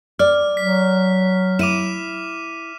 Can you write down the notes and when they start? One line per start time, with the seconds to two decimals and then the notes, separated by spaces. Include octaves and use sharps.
0.19 D5 F6
0.57 F#3 B6
1.59 E4 D6 D#7 E7